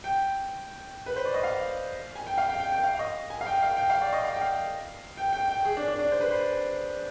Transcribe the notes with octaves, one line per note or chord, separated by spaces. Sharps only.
G5
B4
C5
D5
D#5
F5
G#5
G5
F5
G5
G5
G5
F5
F5
D#5
G#5
F5
G5
F5
G5
F5
D5
D#5
F5
G5
F5
G5
G5
G5
G#4
D4
D4
D4
C5
B4
C5